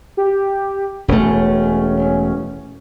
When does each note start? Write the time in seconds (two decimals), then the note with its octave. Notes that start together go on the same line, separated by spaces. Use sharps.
0.17 G4
1.08 E1 A3 C#4